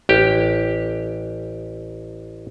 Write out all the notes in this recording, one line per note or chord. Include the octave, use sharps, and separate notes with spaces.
A1 G4